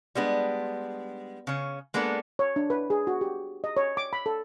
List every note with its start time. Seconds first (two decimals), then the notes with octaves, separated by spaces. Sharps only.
0.15 G3 G#3 B3 D4
1.47 C#3 C#4
1.94 G#3 A#3 B3 D4 A4
2.39 C#5
2.56 D4
2.70 B4
2.90 G#4
3.07 F#4
3.21 G4
3.64 D#5
3.77 C#5
3.97 D6
4.13 B5
4.26 A4